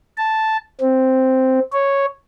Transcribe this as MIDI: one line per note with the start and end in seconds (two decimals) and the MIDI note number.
0.17 0.57 81
0.81 1.59 60
1.73 2.06 73